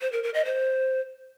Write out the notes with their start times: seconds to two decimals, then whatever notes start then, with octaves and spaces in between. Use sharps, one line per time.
0.01 C5
0.12 A#4
0.23 A#4
0.34 D#5
0.45 C5